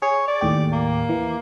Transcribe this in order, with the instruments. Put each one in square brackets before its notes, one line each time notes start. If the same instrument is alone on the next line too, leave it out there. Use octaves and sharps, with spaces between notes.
[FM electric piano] G#4 [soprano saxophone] C#5
[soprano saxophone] D5
[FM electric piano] D#2 A2 G4
[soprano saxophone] A#3
[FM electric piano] E3